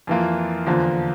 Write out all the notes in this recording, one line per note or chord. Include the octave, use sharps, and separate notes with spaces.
F2 E3 A#3 F4
E2 D3 F3 A#3 F4